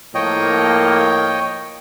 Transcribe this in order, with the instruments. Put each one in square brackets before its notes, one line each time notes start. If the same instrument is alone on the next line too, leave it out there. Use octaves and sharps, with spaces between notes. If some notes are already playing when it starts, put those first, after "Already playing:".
[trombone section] A2 F3 A#3 [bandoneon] C#5 D#5 G5